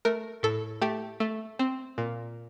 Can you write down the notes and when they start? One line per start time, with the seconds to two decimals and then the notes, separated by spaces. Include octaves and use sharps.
0.05 A3 A#4
0.43 A2 A4
0.81 A3 G4
1.20 A3
1.59 C4
1.98 A#2